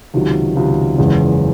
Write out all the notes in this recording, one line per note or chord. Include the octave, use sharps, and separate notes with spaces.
C#2 C3 D#3 F#3
C#2 C3 D#3 F#3
F#1 E2 C#3 G#3